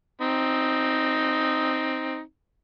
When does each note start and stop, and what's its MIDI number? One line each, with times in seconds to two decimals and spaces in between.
0.21 2.20 60
0.21 2.20 63